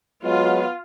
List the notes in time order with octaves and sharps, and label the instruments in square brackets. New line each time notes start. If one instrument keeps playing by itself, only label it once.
[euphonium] F#3 [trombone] G#3 [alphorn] B3 [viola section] F4